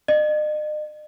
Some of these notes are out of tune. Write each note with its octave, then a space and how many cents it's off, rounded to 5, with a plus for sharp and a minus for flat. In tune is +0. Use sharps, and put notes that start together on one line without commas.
D#5 -45